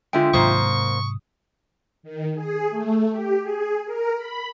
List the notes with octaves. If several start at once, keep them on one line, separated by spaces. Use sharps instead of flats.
D3 G#3 F4 E5 G5
G#2 C3 D#3 F#3 A#3 C5 C#6 D#6
D#3
G#4
A3
G4
G#4
A#4
B5